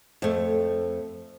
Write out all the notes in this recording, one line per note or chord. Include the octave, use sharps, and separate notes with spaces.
F2 A3